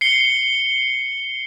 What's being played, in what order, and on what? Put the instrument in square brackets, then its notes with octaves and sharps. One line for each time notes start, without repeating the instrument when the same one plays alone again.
[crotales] C7 C#7 G7